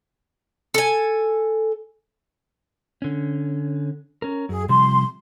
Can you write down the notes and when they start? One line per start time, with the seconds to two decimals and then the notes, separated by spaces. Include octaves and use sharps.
0.74 A4 G#5
3.02 D3 C#4
4.22 C#4 A#4
4.49 F#2 G#4
4.69 C3 F3 G3 C6